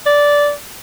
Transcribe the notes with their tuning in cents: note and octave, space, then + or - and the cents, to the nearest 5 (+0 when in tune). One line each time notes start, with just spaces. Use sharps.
D5 -10